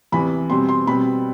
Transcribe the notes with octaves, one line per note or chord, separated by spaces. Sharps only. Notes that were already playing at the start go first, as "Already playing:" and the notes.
E2 C3 E3 B5
B2 G3 C4 C6
C6
B2 G3 C4 B5